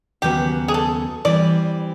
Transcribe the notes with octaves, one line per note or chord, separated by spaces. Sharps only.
D#2 C#3 F#3 B3 G4
G#4
A4
E3 G3 C4 D5